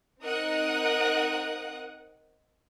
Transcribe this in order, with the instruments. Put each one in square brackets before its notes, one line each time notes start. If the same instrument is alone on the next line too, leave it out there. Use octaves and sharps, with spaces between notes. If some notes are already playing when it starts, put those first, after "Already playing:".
[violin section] C4 D#4 A#4 F#5 D#6 F#6